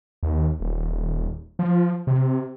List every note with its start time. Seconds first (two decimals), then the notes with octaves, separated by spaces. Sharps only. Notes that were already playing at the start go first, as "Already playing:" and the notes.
0.23 D#2
0.60 D#1
1.59 F3
2.07 C3